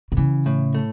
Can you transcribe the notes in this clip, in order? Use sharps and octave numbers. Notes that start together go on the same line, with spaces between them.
B2
C#3 E3
A2
A3